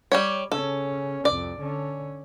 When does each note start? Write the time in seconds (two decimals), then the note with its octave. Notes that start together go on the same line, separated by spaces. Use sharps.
0.12 G3 G4 C#5
0.52 C#3 C#4 A4
1.25 C2 F2 D5
1.59 D3 C#4